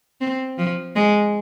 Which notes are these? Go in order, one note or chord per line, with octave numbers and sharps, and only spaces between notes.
C4
F3
G#3